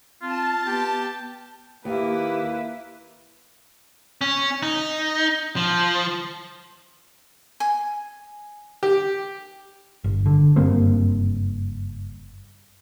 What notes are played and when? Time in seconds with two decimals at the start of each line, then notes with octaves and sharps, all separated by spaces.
0.22 C4 F4 A5
0.66 B3 G4
1.85 D#2 A#3 E4 G4 B4
4.21 C#4
4.63 D#4
5.56 F3
7.60 G#5
8.83 G4
10.04 G1
10.26 D3
10.56 F#1 G2 A#3 C4